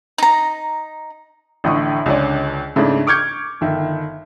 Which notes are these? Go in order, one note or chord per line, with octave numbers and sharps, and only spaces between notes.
D#4 A#5
A1 A2 D3 C#6 D#6
C#2 D3 C#4 D5
G#2 C#3 A3 C4 D4 E4
C#6 D6 F6 G6 G#6 C#7
G1 D#3 E5